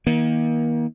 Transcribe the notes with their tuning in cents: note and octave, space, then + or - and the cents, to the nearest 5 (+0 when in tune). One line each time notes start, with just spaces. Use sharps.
D#3 +35 A#3 +30